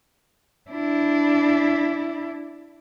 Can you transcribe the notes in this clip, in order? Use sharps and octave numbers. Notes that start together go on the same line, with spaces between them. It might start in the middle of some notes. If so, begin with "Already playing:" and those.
D4 E4